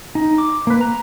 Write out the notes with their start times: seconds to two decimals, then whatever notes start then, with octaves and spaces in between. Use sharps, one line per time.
0.15 D#4
0.38 D6
0.67 A#3 B4
0.81 A#5